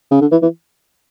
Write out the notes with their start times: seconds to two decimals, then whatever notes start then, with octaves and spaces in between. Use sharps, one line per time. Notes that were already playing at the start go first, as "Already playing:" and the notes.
0.11 C#3
0.21 D3
0.32 E3
0.42 E3